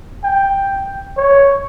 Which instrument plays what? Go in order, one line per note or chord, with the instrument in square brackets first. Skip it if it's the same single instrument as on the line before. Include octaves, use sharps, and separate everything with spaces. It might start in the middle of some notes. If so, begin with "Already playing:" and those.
[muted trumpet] G5
C#5